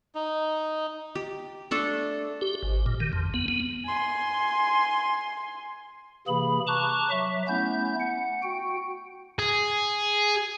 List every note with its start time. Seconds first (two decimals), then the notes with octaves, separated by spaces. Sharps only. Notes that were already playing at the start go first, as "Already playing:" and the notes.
0.15 D#4
1.15 G4
1.71 A3 D4 A4
2.42 G4
2.62 G#1
2.86 A#2
3.00 D#3
3.13 F2
3.34 B3
3.48 B3
3.86 G#5 C6
6.28 C3 E3 A#3 G#4 B5
6.67 A5 A#5 C#6 D6 F#6
7.11 F#3 E5
7.48 A3 B3 C#4 E4 G6
8.00 F#5
8.43 F#4 G5
9.39 G#4